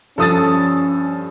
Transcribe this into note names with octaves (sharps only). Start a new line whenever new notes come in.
G2 F3 C#4 A4 D#6 E6 A6